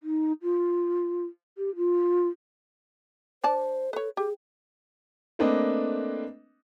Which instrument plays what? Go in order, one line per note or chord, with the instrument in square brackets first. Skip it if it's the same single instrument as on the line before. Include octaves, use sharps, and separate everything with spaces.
[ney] D#4
F4
G4
F4
[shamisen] D4 D5 A5 [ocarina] C5
[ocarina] A4 [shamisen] B4 C#5
[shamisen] G4 [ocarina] G#4
[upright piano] A3 A#3 C4 D4 B4 D#5